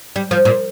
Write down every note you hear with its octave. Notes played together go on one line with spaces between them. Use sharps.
G3
F3
A#2